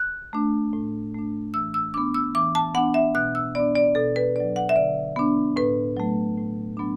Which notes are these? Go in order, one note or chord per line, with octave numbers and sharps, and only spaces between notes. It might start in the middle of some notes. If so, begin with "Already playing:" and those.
Already playing: F#6
A3 D4
A2
A3 D4
E3 E6
E6
B3 D4 D6
E6
E3 D6
A5
B3 D4 F#5
E5
B2 F#6
E6
B3 D4 D5
D5
B2 A4
B4
F#3 D4 D5
F#5
E5
D3 D5
B3 D4
A2 B4
F#3 A3
A2
F#3 B3 D4